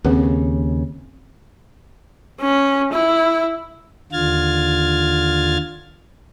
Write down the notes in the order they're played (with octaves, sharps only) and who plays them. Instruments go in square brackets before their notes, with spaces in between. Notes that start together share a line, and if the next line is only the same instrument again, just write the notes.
[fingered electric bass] D#2 C#3 [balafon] C4 G#4 B4
[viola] C#4
E4
[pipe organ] D#2 D3 F4 F6 G#6 A6